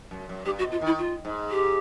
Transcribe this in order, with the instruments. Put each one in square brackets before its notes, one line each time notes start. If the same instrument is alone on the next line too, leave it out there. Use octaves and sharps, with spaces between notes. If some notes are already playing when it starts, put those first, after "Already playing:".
[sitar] F#2
F#2
[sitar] G2 [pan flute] G4
[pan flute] F#4
[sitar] B2
[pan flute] F4
[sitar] D#3 [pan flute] E4
[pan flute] F4
[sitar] G#2
[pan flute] G4